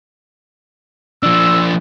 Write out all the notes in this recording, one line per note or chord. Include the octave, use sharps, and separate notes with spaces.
F3 D4 E6